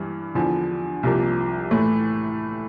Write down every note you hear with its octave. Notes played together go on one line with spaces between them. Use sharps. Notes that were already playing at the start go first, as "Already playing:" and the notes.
Already playing: G2 E3 G3
E2 D3 F3
C2 C3 F3 A#3
A2 E3 A3